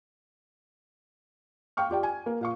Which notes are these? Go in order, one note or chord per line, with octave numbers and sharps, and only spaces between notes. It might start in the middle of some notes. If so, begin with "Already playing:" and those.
F5 G5 C#6 F6
F4 G4 D5 G5
G#5
A#3
A#2 F5 C#6